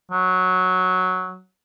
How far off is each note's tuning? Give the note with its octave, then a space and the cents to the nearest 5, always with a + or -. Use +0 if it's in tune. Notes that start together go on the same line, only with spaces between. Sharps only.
F#3 -5